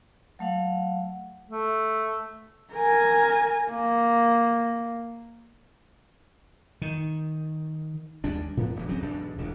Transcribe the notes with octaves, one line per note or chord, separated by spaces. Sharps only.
F#3 A3 F5 F#5
A3
A#4 G#5
A#3
D#3
D#2 G3 G#3 D4
A2 F3 B3 D4
D#1 E3
D1 F#3 C4 C#4
B1 E2 G#2 D4
E1 D2